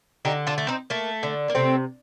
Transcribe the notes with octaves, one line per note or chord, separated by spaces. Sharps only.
D3 D#4 G4
D4 F4
A3
C4 D#4
A3 A#3
D3
A#3
C3 A3 C4